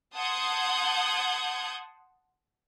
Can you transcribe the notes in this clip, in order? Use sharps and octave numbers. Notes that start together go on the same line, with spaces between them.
F#5 A5 C6 D#6 G6 G#6